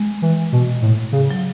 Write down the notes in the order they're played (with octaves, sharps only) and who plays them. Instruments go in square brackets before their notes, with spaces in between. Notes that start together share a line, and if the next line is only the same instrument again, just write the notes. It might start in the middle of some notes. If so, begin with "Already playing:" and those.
Already playing: [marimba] G#3
[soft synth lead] E3
B2
A2
C#3
[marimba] F#3